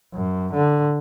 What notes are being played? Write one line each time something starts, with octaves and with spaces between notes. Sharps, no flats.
F#2
D3